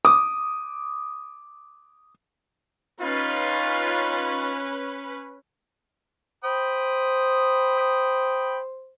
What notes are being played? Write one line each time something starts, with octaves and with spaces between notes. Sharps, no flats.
D6 D#6
C#4 D#4 F4 B4
C5 G5 B5 D#6